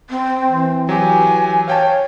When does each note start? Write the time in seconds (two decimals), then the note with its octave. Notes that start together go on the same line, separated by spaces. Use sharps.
0.10 C4
0.47 E3
0.89 F#3 G4 G#5
1.68 C#5 F5 G5 A5